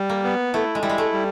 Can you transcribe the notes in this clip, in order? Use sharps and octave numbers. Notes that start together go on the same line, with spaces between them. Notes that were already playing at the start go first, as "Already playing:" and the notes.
Already playing: G3
A#3
B3
A3 E4
G#3
G3 E4
G#3
A3
G3